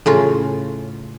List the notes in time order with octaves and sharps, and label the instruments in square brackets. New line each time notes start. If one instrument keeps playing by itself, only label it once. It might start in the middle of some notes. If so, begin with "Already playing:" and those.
[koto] A2 C#3 F4